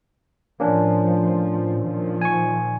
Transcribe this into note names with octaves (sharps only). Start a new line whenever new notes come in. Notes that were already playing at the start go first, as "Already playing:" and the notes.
A2 F3 A#3 C#4 D4
A#2 D#3 F3
G#5 C#6